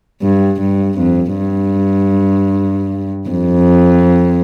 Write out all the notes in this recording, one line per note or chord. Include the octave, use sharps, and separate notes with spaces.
G2
G2
F2
G2
F2